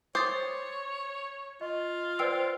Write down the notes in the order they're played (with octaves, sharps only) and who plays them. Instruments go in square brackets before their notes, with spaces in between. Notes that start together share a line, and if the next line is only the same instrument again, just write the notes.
[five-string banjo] C5 [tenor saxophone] C#5 [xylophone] D6 D#6 A6
[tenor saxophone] F4 [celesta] D#5
[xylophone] B4 G5 E6 [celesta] C5 D5 C7